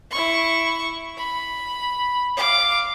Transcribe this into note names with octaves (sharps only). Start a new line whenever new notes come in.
E4 C#6
B5
F5 D6